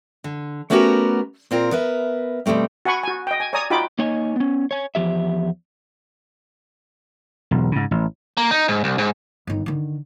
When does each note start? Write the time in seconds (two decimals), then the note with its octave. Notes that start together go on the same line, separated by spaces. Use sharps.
0.24 D3
0.70 A3 B3 C#4 F#4 G4 A#4
1.51 A#2 C4 F4 A#4
1.72 B3 A#4 B4 E5
2.46 B2 F3 G3 A3 C4
2.85 F#4 F#5 G#5 B5 C#6
3.03 F#4 G#5
3.27 D#5 G5
3.40 G#5
3.53 C#5 D5 G#5 A#5 D#6
3.70 D#4 F4 F#4 G5 B5 D6
3.99 A#3 D#4 C#5 D#5 G#5
4.36 B3 C#4
4.71 C#5 G#5
4.95 E2 G2 F3 G4 E5
7.51 E1 B1
7.72 G#2 C#3
7.91 A1
8.37 A#3
8.51 D#4
8.68 G#2
8.84 C2
8.98 G#2
9.47 G1 D#3
9.66 D3 D#3